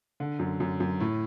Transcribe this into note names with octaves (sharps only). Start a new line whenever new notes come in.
D3
F#2
F#2
F#2
A2